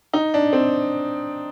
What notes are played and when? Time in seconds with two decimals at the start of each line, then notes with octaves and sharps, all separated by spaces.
0.13 D#4
0.34 D4
0.53 C4